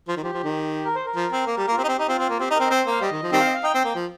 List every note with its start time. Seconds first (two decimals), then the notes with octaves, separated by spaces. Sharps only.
0.08 F3
0.17 D#3
0.23 F3 G4
0.33 F3
0.44 D#3
0.85 A#4
0.95 C5
1.06 A#4
1.16 F3
1.32 C4
1.46 A#3
1.57 G3
1.68 A#3
1.72 F4
1.78 C4 G4
1.84 D#4
1.88 C4
1.97 D#4 G4
2.08 C4 F4
2.19 C4
2.29 A#3
2.40 C4 G4
2.50 D#4
2.55 C4 A#4
2.67 D#5
2.71 C4 C5
2.87 A#3 F5
3.01 G3 D#5
3.12 D#3
3.23 F3
3.32 D#3 G3 C4 G5
3.40 F5
3.47 D#5
3.54 F5
3.63 D#4 G5
3.74 C4
3.84 A#3
3.95 F3